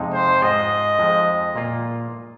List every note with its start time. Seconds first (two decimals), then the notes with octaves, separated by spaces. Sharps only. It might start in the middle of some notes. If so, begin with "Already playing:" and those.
Already playing: F2 C3 G#3 D#4
0.13 C5
0.42 G#2 G#3 F4 D#5
0.99 F2 F3 G#3
1.56 A#2 A#3 F4